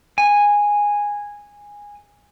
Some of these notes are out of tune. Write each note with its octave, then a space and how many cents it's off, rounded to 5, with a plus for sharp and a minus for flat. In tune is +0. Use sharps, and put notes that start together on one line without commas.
G#5 -10